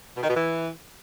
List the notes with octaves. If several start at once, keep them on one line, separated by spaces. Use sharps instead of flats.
B2
D#3
B2
E3